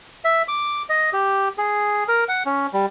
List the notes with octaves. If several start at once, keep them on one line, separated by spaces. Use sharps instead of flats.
E5
D6
D#5
G4
G#4
A#4
F#5
C#4
G3